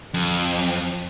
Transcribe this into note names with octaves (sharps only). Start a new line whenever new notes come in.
F2